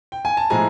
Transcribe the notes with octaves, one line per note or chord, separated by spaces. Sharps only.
G5
G#5
A5
A2 F3 G#3 G#5 A#5